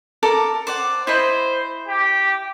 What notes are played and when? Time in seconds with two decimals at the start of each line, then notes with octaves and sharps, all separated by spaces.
0.23 A4 A#4 D5
0.67 C5 D5 F#5
1.07 E4 C5 D#5 B5
1.88 G4